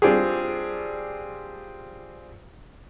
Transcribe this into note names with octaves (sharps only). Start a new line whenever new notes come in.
G3 C4 D4 F4 G4 G#4